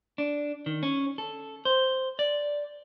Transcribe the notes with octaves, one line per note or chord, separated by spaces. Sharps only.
D4
D#3
C#4
A4
C5
D5